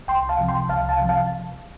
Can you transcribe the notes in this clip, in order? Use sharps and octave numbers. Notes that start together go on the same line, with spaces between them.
C2 G5 C6
F5 A5
C3 F3
G5 C6
C2 F5 A5
F5 A5
C3 F3
F5 A5